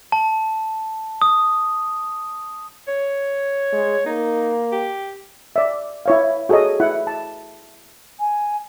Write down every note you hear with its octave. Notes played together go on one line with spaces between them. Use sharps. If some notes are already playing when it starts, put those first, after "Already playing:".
A5
D#6
C#5
G#3
A#3 D#4
G4
D5 E5
E4 C#5 F5
F#4 G#4 A4 C#5 D#5
E4 F#5
A5
G#5